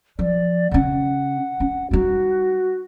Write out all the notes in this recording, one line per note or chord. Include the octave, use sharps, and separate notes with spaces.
F3 D5
C#3 C#4 F#5
C#4
G3 D#4 F#4